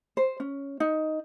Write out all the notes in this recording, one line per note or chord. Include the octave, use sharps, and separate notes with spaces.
C5
C#4
D#4